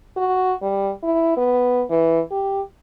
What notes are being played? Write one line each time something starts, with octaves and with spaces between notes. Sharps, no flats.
F#4
G3
E4
B3
E3
G4